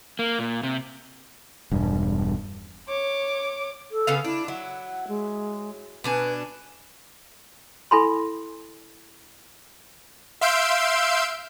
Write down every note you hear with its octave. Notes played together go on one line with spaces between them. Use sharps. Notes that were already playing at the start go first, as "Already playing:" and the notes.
A#3
A#2
C3
E1 G2
C#5 D6
A4
C#3 B3 F5
D4 E4
F#3 E4 F#5
G#3
B2 D4 B4 G#5
E4 A4 G#5 B5 C6
E5 F5 C6 E6 G6 D7